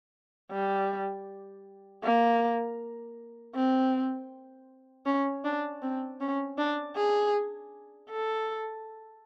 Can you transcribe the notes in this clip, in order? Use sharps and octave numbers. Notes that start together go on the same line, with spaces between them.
G3
A#3
C4
C#4
D4
C4
C#4
D4
G#4
A4